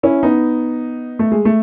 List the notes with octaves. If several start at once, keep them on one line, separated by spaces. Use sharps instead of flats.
C#4 E4
B3 D#4
A3
G#3
A3